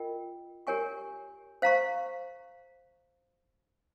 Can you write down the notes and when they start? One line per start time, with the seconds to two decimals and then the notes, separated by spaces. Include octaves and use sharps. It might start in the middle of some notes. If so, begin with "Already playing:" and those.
Already playing: F4 A#4 D#5 G5
0.67 G4 A#4 C#5 G#5 C#6
1.62 C5 F5 A#5 C#6